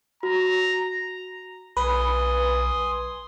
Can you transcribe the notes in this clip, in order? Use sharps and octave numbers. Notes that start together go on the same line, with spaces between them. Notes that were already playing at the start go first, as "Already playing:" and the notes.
F#4 A#5
B1 B4 G#5 C6 D#6